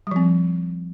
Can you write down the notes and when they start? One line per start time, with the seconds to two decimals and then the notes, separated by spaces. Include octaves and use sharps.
0.07 G3
0.11 F3
0.16 C4